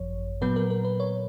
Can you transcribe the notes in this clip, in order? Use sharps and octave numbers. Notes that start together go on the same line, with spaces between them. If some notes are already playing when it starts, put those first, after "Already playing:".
Already playing: G#1 F#2 F3 C#5
A#2 F#3 B3 B4
A#4
A#4
B4
C#5